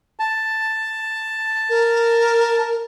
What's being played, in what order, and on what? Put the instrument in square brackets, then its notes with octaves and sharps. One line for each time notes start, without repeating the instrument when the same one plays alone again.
[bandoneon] A5
[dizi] A#4